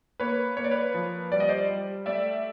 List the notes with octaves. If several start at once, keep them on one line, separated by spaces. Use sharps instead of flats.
A#3 B4 C#5
A#3 C#5
D5
B4 C#5
F3
G3 D5
D#5
C5 D5
G3
A3 D5 E5